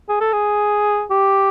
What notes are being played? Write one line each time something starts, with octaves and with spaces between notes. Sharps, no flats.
G#4
A4
G#4
G4